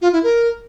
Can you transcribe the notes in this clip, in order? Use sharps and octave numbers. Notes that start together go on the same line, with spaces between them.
F4
E4
A#4